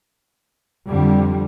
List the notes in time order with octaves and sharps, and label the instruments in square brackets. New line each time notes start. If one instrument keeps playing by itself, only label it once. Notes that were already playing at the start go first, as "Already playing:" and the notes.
[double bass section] F2 D3 G3